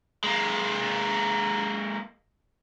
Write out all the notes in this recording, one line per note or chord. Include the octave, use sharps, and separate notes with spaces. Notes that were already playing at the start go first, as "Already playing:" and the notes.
G#3 A#3